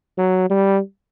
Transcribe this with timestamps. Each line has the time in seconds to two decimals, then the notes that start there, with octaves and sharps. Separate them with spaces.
0.18 F#3
0.50 G3